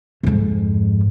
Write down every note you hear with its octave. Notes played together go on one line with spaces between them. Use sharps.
F2 G#2